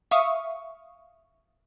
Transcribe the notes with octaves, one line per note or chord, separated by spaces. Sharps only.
E5 F5 C#6 D#6